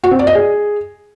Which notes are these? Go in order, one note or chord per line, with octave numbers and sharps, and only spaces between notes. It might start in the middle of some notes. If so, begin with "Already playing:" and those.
F#4
C4
D5
D#5
G#4